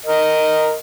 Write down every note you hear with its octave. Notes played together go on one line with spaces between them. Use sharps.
A#4 D#5